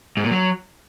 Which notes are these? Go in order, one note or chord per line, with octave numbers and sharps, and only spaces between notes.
G#2
A#2
F#3